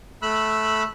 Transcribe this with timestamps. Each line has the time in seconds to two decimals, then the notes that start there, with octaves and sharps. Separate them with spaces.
0.22 A3 B5 E6 F#6